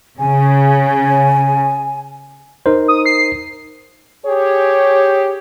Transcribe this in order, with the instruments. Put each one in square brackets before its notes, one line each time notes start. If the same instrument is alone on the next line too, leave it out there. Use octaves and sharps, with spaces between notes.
[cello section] C#3 [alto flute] G#5
[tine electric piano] D#4 A#4 C5
[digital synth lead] D#6
C7
[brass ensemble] G4 G#4 C#5